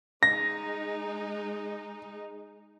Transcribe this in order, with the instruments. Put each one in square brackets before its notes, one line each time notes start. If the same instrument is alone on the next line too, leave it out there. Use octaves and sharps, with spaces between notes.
[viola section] G#3 D#4 [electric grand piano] A#6